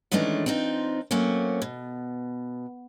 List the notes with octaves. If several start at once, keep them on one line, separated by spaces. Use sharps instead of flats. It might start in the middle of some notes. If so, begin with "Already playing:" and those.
D#3 E3 G#3 A3 C#4 D4
C4 D4 D#4 F4
F#3 A3 A#3 C4 C#4
B2